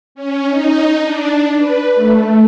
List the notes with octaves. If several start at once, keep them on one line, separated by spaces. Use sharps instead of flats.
C#4
D#4
D4
B4
A3